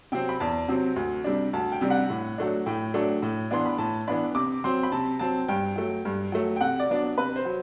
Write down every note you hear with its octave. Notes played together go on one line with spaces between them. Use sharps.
C3 F#3 C4 G5
B5
E2 A5
C3 F#3 C4
D2
C3 G3 D4
D2 A5
G5
C3 G3 D4
F#5
A2
F#3 A3 D4
A2 G5
F#3 A3 D4
A2
E3 B3 D4 C6
B5
A2 A5
E3 B3 D4 B5
C3 D6
F#3 C4 C6
B5
C3 A5
F#3 C4 A5
G2 G5
F#3 A3
G2
F#3 A3
G5
C3 F#5
D5
F#3 B3 D4
C3 B4
C5
F#3